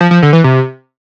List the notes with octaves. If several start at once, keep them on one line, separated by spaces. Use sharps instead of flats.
F3
F3
D3
E3
C3